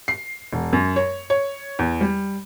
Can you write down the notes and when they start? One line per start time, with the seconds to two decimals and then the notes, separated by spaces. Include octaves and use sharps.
0.08 C7
0.53 E1
0.73 F#2
0.96 C#5
1.30 C#5
1.79 E2
2.01 G3